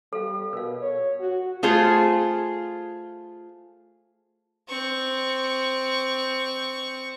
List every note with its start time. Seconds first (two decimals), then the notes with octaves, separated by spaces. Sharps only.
0.13 G3 A4 F5
0.53 B2 A#4 F5
0.82 C#5
1.20 F#4
1.63 A3 F4 G#4 C5
4.68 C4 C#6